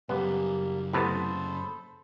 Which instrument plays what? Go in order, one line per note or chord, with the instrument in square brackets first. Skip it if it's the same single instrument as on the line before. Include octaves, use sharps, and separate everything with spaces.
[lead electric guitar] F#2 C#3 [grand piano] G3 [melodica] A#3 [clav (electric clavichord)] B3
[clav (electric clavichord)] A2 C3 B3 [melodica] A4 C5 [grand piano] B5 D#6 A6